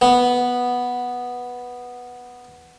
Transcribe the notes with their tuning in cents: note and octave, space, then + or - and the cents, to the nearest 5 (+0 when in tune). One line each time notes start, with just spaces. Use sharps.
B3 -5